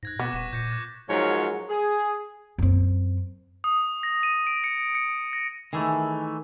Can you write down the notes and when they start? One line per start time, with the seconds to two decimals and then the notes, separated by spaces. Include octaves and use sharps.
0.03 G#2 F#6 G#6 A#6
0.19 B2 B3 C#6 D6 A#6
0.33 D#1 C#6 B6 E7
0.53 A#2 G6 A#6 C#7
0.71 F#6 A6
1.10 G#2 F3 F#3 G#3 A#4 C#5
1.69 G#4
2.58 F#2 C4
3.64 D#6
4.03 A#6
4.23 D#7
4.47 D7
4.64 C#7
4.95 C#7
5.33 A#6
5.73 D#3 E3 A3 G#4